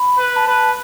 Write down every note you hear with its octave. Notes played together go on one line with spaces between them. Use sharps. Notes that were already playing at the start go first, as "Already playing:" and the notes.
Already playing: B5
B4
B5
A5
B4